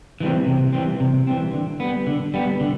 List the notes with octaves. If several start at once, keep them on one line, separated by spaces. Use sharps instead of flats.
E3 G3 C4
C3
E3 G3 C4
C3
E3 G3 C4
D3
G3 B3
D3
G3 B3
D3